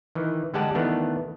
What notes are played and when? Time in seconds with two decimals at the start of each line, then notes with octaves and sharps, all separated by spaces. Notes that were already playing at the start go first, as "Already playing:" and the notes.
0.15 D#3 E3
0.54 D3 G3 G#3 G4 F#5 A5
0.75 D#3 E3 A3 B3 D4